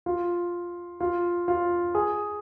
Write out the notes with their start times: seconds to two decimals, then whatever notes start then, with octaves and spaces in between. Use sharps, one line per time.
0.06 F4
1.00 F4
1.48 F4
1.95 G#4